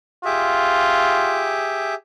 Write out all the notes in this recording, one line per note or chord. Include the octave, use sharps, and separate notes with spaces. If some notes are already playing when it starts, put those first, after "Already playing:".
F4 G4 G#4 E5